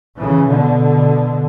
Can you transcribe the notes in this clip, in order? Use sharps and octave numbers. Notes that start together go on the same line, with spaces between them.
C#3 E3
B2 D3